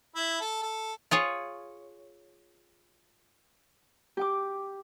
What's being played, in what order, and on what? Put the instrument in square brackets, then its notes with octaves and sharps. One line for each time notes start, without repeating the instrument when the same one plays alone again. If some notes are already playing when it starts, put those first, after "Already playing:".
[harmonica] E4
A4
A4
[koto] F4 G#4 C#5
[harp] G4 G5 D6